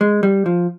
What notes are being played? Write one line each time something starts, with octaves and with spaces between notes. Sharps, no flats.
G#3
G3
F3